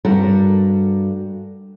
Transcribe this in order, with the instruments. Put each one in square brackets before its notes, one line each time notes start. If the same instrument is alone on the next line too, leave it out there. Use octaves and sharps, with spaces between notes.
[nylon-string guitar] G2 G3 F#4 A4 A#4 F#5